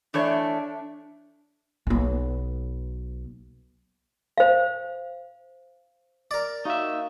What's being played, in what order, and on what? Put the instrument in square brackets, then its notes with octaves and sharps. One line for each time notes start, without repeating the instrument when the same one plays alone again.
[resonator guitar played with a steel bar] E3 A3 C#5 [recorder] D4
[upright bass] B1 B3
[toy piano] C5 F5
[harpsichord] A#4 D5
[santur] A#3 F#4 [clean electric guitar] D#4 E5